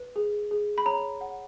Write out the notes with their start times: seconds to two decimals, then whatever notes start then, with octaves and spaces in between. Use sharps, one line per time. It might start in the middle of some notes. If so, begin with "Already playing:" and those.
Already playing: B4
0.16 G#4
0.51 G#4
0.78 B5
0.86 C#5 A#5
1.21 F#5